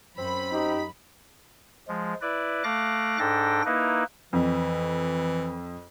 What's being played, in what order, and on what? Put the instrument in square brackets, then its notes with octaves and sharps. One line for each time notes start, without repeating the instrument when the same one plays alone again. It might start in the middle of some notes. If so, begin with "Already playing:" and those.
[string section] F#2 B5 [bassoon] C4
[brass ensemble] D#4 G4
[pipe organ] F3 G#3
E4 B4 D5
A3 F5 D6 F#6 A#6
G#2 D4 A4 G5 A#6
A#3 D#4 E4 B4
[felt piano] F2 [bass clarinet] E3